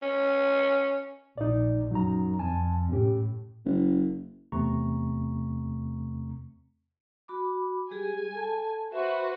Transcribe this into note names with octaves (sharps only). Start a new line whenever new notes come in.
C#4
A#1 D#4 D5
F#2 F#3 D#4 A#5
F2 G#5 A5
A2 C#4 G4
F#1
E2 C3 A3 C4 A#5 C#6
F#4 B5 D6
G3 G4 G#4 G#5
A4 A5
F#4 B4 C5 E5